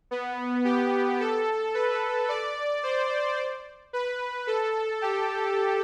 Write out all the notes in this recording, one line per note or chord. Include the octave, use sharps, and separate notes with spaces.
B3
G4
A4
B4
D5
C5
B4
A4
G4